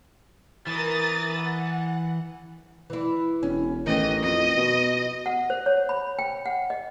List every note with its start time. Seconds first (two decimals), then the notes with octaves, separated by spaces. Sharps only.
0.67 E3 A#4 D#6 A6
1.38 F#5
2.90 E3 E4
3.43 E1 C#4
3.86 A1 D#3 E3 D#5
4.23 F2 D#5
4.57 B2
5.26 F#5
5.50 C5
5.66 C#5
5.89 B5
6.19 G5
6.46 F#5
6.70 D#5